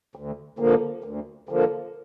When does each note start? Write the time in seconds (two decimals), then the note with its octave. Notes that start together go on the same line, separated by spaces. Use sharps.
0.16 D2
0.59 D3 F3 A#3
1.04 D2
1.49 D3 F3 A#3